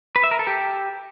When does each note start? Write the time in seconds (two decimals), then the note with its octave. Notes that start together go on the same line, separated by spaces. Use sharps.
0.16 B4
0.23 E5
0.31 A#4
0.39 A4
0.47 G4